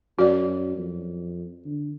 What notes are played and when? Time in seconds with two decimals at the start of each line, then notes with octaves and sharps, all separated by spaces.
0.19 F#2 F#4 D5
0.77 F2
1.65 D3